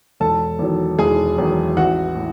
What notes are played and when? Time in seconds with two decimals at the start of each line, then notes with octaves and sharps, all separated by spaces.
0.20 E1 A4 A5
0.59 E2 D#3 F#3
0.98 E1 G#4 G#5
1.38 E2 D#3 F#3
1.77 A1 F#4 F#5
2.15 A2